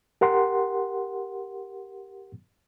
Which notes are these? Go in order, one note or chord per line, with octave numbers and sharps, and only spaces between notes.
G4 A#4 F#5 C6